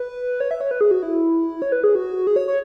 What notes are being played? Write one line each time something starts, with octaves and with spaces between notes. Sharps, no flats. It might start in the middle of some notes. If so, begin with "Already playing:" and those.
Already playing: B4
C#5
E5
C#5
B4
G#4
F#4
E4
C#5
B4
G#4
F#4
G#4
C#5
C#5